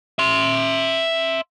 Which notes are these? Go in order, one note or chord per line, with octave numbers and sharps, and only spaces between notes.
E5 C6